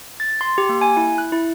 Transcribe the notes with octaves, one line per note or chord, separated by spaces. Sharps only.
A6
C6
G4
A#3
G#5
E4
F#6
E4